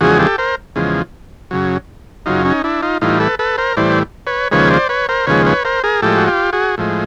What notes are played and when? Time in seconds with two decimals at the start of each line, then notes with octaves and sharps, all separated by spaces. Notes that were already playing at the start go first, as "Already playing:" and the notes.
0.01 E2 C#3 F3 G#3 F#4 G#4
0.19 G4 A4
0.38 A#4 C5
0.76 E2 C#3 F3 G#3
1.51 F#2 C#3 F#3
2.26 F#2 C#3 F#3 D#4 F4
2.45 C#4 D#4
2.64 D4 E4
2.83 D#4 F4
3.01 A2 E3 G3 D#4 F4
3.20 A4 B4
3.39 A4 B4
3.58 A#4 C5
3.77 A2 E3 G3 C5 D5
4.27 B4 C#5
4.51 D#2 C#3 F3 G#3 B4 C#5
4.71 C5 D5
4.89 B4 C#5
5.09 A#4 C5
5.27 D#2 C#3 F3 G#3 B4 C#5
5.46 B4 C#5
5.65 A#4 C5
5.84 G#4 A#4
6.02 A2 F3 G#3 G4 A4
6.18 F#4
6.27 F4 G4
6.53 F#4 G#4
6.78 A2 F3 G#3